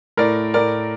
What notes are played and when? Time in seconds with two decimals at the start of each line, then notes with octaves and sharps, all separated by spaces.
0.17 A2 A#4 D5
0.54 A2 A#4 D5